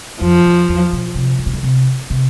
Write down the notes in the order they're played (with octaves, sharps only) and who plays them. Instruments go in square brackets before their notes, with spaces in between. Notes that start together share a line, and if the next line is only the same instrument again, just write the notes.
[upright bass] F2 [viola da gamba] F3
[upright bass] E2
E2
B2
C3
D3
C3
D3
C3
C3